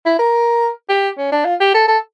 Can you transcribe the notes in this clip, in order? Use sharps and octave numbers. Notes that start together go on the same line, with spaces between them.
E4
A#4
G4
C#4
D4
F4
G4
A4
A4